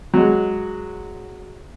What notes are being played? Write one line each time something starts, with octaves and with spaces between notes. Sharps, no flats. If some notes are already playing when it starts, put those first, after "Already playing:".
F#3 G#3